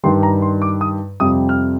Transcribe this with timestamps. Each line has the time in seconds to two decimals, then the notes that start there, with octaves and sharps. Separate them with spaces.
0.04 G2 D#3 G3 C6
0.23 A#5
0.42 C6
0.62 D6
0.81 D#6
1.20 F2 C3 G3 D#6
1.49 F6